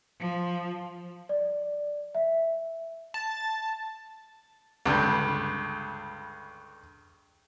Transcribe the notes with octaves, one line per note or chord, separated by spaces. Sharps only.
F3
D5
E5
A5
C#2 G2 D3